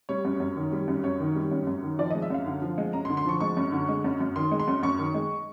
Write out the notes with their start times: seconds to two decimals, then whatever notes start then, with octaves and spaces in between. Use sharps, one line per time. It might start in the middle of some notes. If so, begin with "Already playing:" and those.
0.09 G3 C#5
0.25 F#2
0.40 F#2
0.56 D#3
0.72 G3
0.88 F#2
1.04 F#2 C#5
1.20 D#3
1.36 G3
1.51 F#2
1.67 F#2
1.83 D#3
1.99 F3 D5
2.10 G#3 D#5
2.22 E5
2.30 F#2 F5
2.46 D3
2.62 F3
2.78 G#3
2.93 F#2 A#5
3.05 C6
3.09 D3
3.17 C6
3.25 F3 C#6
3.40 G#3 C#6
3.57 F#2
3.72 D3
3.88 G#3
4.04 F#2
4.20 F#2
4.35 D#3 C6
4.51 G#3
4.60 C6
4.68 F#2
4.83 F#2 C#6
4.99 D#3
5.14 G#3